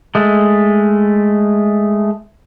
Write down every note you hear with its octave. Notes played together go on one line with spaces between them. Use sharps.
G#3 A3